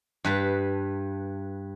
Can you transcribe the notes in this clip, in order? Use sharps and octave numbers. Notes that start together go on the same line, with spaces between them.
G2 B4 A5